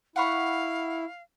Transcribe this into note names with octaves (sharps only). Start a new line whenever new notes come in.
E4 F5 F#5 B5 C#6